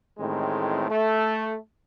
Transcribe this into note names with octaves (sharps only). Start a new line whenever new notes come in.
A1 A2 D#3 G#3 C4
A3